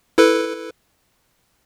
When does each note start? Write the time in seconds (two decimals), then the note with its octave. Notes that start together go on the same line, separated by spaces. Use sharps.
0.18 E4 A4 B4